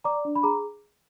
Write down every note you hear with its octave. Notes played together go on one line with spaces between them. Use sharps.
D5 A#5 D6
D4
B5
G#4 A#5 D6